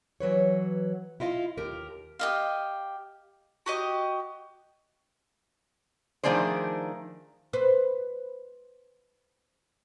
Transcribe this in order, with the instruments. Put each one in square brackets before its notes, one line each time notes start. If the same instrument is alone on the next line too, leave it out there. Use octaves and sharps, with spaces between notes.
[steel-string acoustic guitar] E3 F#3 B4 C#5
E4 F4 D#5 F5
D#2 G4 A#4
[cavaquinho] G4 D#5 F5
[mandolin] F#4 G4 D#5
[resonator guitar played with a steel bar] D#3 F3 A3 D4 G#4 C5
[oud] B4 C5